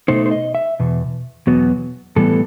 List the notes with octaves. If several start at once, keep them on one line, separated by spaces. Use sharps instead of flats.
B2 A3 D#4 C5
C5
D#5
E5
E2 B2
E2 B2 F#3 B3
A2 E3 G3 B3 A4